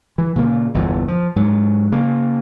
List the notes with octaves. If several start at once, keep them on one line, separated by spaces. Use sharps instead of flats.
E3
A#2 C#3 A#3
G1 E2 A#2 E3
F3
G#2 F#3
C#3 A#3